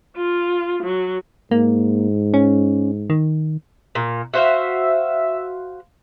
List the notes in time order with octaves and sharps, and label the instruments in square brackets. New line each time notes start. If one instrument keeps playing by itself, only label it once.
[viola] F4
F#3
[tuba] G#2 [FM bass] A#3
[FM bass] C#4
D#3
[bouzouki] A#2
[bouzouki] F#4 C5 F5 [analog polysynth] E5